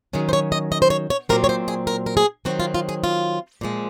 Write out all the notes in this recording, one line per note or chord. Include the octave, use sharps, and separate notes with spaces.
D#3 F#3 C#4 G#4
C5
C#5
D#5
D#5
C5
C#5
C#5
A#2 F#3 C4 A#4
C#5
C5
G#4
A#4
A#4
G#4
D#3 F#3 C4 F#4
F4
F4
G#4
F4
A#2 F3 G#3